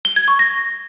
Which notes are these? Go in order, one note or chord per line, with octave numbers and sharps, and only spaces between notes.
G7
G#6
C#6
A#6